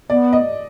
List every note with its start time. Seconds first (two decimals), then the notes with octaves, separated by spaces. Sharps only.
0.10 B3 D5
0.33 D#5